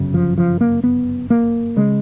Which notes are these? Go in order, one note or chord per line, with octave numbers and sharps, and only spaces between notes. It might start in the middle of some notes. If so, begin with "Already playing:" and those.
Already playing: G1 F#2 C#3
F3
F3
A#3
B3
A#3
C#3 G#3